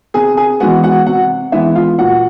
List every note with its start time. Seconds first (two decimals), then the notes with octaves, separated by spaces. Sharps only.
0.14 C3 G#4 G#5
0.37 G#4 G#5
0.60 E3 G#3 B3 F#4 F#5
0.84 F#4 F#5
1.06 C3 F#4 F#5
1.52 E3 G#3 B3 E4 E5
1.75 F4 F5
1.98 A#2 F#4 F#5